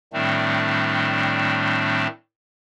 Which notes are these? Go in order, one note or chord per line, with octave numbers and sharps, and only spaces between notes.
A2 D#3 G3 A3 C4 D4